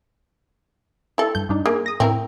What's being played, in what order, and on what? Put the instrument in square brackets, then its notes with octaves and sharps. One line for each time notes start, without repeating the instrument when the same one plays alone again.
[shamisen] E4 A4
[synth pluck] G2 G6
G2 D4 D#4
[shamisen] A#3 [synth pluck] G#4
[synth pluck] D#6 A#6
[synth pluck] A2 A#4 [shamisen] C4 E4